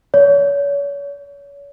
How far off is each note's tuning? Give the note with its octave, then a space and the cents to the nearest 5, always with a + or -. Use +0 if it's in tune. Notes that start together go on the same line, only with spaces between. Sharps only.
C#5 +35